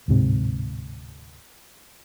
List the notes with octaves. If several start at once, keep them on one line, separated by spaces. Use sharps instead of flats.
D1 G#2 C3